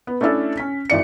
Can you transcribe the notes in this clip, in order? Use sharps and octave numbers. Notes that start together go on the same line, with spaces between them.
B3
A3 C#4 D4 E4 A4
C#4 B6
G#1 E3 D5 C#7